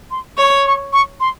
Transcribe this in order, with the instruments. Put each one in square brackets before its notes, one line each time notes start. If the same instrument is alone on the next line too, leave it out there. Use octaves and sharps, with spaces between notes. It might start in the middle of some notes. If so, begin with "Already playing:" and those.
[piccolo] C6
[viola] C#5 [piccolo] C#6
[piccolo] C#6
C#6
C6